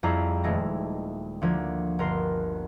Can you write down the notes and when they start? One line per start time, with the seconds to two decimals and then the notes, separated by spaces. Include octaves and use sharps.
0.03 F2 G3 E4 G#4 A#5 C7
0.44 D#1 G#3 A3 A#6
1.42 D2 F3 A#3 G#6
1.99 G1 A#4 C6 C7